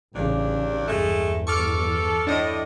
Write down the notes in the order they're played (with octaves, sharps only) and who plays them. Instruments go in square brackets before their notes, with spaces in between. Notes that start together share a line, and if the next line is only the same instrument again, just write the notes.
[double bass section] A1 C#3 [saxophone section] D#2 D4
[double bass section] E2 G2 [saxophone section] G#3 A3
[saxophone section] A4 [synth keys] C#6 D6 F6
[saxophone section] A2 [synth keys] D4 D#5